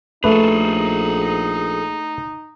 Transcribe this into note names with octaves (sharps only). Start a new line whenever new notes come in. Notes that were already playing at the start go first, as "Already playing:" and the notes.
A#1 A3 D#4 G#4 A4 B4